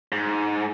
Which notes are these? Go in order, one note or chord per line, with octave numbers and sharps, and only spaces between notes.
G#2